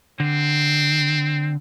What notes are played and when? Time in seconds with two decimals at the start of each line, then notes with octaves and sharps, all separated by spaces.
0.20 D3 C4